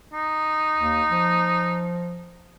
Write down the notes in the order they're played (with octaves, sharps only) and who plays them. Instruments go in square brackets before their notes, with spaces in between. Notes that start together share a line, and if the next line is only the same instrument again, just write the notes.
[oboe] D#4
[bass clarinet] D#2
F3